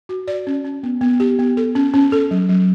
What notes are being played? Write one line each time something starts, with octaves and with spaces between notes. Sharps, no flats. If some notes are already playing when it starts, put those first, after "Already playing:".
F#4
D5
C#4
C#4
B3
B3
G4
B3
A4
C#4
C#4
A4
F#3
F#3